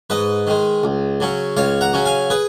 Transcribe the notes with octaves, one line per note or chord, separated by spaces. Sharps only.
G#2 B4 D#5
D#3 G#3
C#2
C#3 F#3 C#4
C#2 C#5 F5
F#5 A#5
C#3 F#3 C#4
F5 G#5
G#4 B4